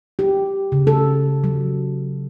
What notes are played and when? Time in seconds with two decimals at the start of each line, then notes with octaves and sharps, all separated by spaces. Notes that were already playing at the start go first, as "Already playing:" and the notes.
0.19 G4
0.72 C#3
0.87 A4
1.44 F#3